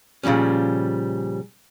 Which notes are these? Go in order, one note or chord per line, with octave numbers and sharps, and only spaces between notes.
A#2 C#3 F3 G3 C#4